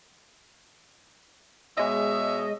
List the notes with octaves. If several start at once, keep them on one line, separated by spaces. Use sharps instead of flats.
B2 G#3 C#5 D#5 E5